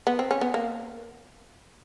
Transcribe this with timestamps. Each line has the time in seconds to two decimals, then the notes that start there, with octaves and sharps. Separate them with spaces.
0.07 B3
0.19 C4
0.31 C#4
0.41 B3
0.54 A#3